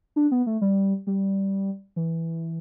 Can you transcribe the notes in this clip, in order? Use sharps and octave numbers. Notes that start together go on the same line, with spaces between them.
D4
B3
A3
G3
G3
E3